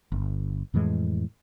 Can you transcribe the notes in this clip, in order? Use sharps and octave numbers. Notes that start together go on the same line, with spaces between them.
G1
F2 A2 E3 G#3